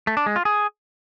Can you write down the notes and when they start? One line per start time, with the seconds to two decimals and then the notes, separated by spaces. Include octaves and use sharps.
0.07 A3
0.17 D4
0.26 G#3
0.36 F4
0.45 G#4